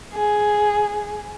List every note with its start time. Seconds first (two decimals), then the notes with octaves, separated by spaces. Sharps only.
0.14 G#4